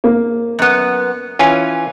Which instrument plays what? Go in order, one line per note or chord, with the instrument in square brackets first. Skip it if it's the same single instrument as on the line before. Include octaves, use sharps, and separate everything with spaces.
[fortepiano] A#3
[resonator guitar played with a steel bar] F#2 B3
[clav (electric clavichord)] E3 C#4 F4 [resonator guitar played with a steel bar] G#5